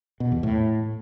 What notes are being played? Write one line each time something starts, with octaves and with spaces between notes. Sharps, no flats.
B2
E2
A2